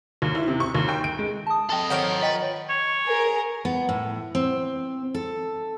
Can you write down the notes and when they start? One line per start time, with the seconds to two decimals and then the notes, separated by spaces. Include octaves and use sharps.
0.22 D#2
0.35 E4
0.48 C3
0.60 C#6
0.75 D#2
0.89 G5
1.04 D7
1.19 G#3
1.47 A5 D#6
1.70 A4 D#5 G5 A5
1.90 D#3 F3 C#5 F#5 D7
2.23 B4 D#5 G5 A6
2.69 C#5
3.05 G#4 A#4
3.65 B3
3.89 A2
4.35 C4
5.14 A4